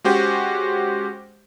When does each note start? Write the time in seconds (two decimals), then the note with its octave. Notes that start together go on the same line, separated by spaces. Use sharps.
0.04 G#3 C#4 F#4 G4 C5